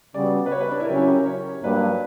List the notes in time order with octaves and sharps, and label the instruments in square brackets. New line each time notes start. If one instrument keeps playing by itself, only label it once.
[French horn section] C#3 G3 B3 F#4 [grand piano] D5
[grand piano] B4
C#5
B4
D4
E4
A#4
[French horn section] C#3 F#3 C#4 [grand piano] G4
[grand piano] E4
G4
A#4
C#5
[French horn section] G2 F#3 A#3 D4 [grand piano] B4